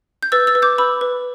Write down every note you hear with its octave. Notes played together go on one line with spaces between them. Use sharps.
G6
B4 E6 A6
E6 A6
B4
D6 G6
B4 B5 E6
B4